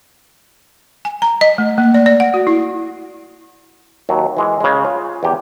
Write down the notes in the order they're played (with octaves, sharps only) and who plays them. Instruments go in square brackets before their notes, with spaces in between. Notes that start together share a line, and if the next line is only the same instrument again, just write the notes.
[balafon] G#5
A#5
D#5
A3
A#3
D5
D5
F#5
F#4
E4
[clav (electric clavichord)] D#2 F#3
E3 G#3
C#3 G#3
F4
E2 G4